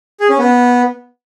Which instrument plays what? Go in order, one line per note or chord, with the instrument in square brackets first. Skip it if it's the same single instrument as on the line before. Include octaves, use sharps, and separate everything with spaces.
[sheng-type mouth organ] G#4
C#4
B3